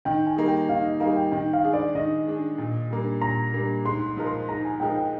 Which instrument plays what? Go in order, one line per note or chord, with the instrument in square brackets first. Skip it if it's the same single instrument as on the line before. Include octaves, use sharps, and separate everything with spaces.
[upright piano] D#3 [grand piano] G5
[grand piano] G#5
[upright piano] G3 A#3 D#4 G#4
[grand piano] G5
[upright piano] D#3 [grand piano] F5
[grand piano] D#5
[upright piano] G3 A#3 D#4 G#4 [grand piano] F5
[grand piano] G5
[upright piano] D#3 [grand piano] G5
[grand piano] F5
[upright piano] G#3 D4 G#4
[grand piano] D5
[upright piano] D#3 [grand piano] D#5
[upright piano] G#3 D4 G#4
A#2
G3 A#3 D4
[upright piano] A#2 [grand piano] A#5
[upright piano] G3 A#3 D4
[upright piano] G#2 [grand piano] C6
[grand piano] C6
[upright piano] F3 G#3 D#4 A#4
[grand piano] C6
[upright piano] G#2 [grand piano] A#5
[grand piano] G#5
[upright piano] F3 G#3 D#4 A#4 [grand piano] G5
[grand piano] G5